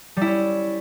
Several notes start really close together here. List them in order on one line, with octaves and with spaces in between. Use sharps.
G3 E4 C#4